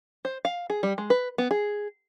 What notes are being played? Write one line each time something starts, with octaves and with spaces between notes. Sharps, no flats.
C5
F5
G#4
G3
G#3
B4
B3
G#4